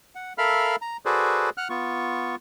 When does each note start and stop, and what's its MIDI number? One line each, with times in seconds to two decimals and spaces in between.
0.15 0.33 78
0.38 0.76 69
0.38 0.76 70
0.38 0.76 76
0.38 0.76 77
0.38 0.76 83
0.38 0.76 89
0.82 0.97 82
1.05 1.50 66
1.05 1.50 68
1.05 1.50 69
1.05 1.50 71
1.05 1.50 72
1.05 1.50 74
1.57 1.68 78
1.57 1.68 89
1.57 1.68 90
1.70 2.36 59
1.70 2.36 65
1.70 2.36 85